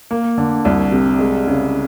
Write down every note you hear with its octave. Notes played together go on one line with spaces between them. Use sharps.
A#3
D3
C2
C3
G#3
C#3